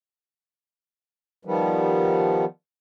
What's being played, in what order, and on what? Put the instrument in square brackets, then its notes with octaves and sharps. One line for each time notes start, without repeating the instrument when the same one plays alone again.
[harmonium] D#3 F3 G3 B3